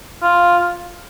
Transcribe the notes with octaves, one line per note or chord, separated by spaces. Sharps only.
F4